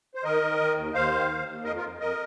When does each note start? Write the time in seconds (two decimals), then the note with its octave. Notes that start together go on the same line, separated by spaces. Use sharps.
0.15 C5
0.24 D#3 A#4 D#5
0.41 D#3
0.59 D#3
0.76 D#2
0.94 D#2 C5 F5
1.12 D#3
1.29 D#2
1.47 D#2
1.64 F2 A#4 D#5
1.76 F4 A#4
1.83 F2
2.00 F2 A#4 D#5